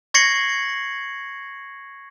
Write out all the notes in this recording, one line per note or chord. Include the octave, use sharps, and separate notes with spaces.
C#6 G#6 A#6 C7 C#7 F#7